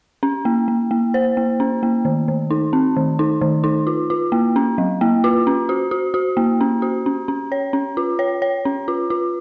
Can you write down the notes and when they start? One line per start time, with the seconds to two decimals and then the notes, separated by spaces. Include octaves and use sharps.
0.23 C#4
0.45 A#3
0.68 A#3
0.91 A#3
1.14 C5
1.37 A#3
1.60 C#4
1.83 A#3
2.05 D#3
2.28 D#3
2.51 D#4
2.73 C4
2.97 D#3
3.19 D#4
3.41 D#3
3.64 D#4
3.87 F4
4.10 F4
4.32 A#3
4.56 C#4
4.78 F#3
5.01 A#3
5.24 F4
5.47 C#4
5.69 F#4
5.91 F#4
6.14 F#4
6.37 A#3
6.61 C#4
6.82 F#4
7.06 C#4
7.28 C#4
7.52 C#5
7.73 C#4
7.97 F4
8.19 C#5
8.42 C#5
8.65 C#4
8.88 F4
9.10 F4